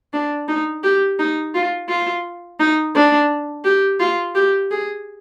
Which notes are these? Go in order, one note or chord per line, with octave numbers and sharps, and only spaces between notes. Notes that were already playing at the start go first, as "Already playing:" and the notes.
D4
D#4
G4
D#4
F4
F4
D#4
D4
G4
F4
G4
G#4